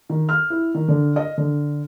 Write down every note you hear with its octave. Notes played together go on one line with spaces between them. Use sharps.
D#3
F6
E4
D#3
D3
D#5
D3